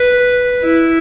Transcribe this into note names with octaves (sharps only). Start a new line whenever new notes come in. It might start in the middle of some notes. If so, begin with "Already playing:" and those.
Already playing: B4
E4